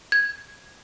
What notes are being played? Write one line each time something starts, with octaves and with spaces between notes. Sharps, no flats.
G#6